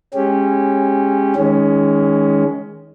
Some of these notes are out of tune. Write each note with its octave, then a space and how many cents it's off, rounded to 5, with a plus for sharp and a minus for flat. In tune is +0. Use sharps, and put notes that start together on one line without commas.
G#3 +0 C#4 -15 G4 +0
D#3 +20 G#3 +0 C#4 +20